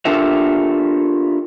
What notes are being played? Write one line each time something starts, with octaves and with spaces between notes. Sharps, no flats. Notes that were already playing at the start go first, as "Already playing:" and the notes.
D4 F4 G4 A4 A#4 E5